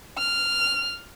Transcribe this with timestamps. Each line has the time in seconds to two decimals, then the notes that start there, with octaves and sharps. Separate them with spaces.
0.17 F6